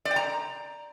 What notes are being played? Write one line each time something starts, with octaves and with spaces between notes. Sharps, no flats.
D5
G5
A#5